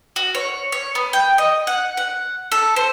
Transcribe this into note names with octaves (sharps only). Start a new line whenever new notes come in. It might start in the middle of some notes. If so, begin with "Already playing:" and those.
F#4
C#5
C#5
B3
G5
D#5
F#5
F#5
A4
C5